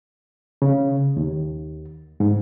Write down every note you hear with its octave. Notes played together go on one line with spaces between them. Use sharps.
C#3
D#2
G#2